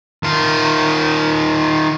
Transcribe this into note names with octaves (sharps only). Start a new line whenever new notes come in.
D#3 F4